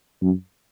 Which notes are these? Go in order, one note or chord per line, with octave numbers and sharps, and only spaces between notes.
F#2